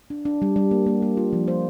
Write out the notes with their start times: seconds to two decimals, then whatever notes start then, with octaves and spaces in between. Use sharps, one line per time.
0.10 D4
0.25 D4
0.42 G3
0.56 G3
0.71 A#3
0.87 A#3
1.02 A#3
1.17 F4
1.33 F3
1.48 C5